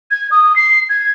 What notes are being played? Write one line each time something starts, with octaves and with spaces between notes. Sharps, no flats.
G#6
D#6
C7
G#6